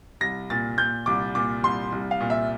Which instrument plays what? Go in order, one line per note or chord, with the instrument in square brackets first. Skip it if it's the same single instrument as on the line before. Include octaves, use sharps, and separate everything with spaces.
[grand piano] C2 A#6
A#2 A6
A#2 G6
C2 D6
A#2 D6
C2 C6
C2
F5
A#2
E5